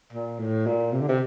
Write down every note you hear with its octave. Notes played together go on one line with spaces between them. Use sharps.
A#2
A2
A#2
C3
D3
C3